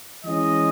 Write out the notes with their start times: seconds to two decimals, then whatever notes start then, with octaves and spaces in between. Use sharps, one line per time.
0.24 E3 G#3 C#4 D#5